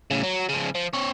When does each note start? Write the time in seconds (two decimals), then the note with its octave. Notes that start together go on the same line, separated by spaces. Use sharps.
0.11 A2 C#3
0.23 F#3
0.49 C#3 F3
0.75 F3
0.94 C4 C#5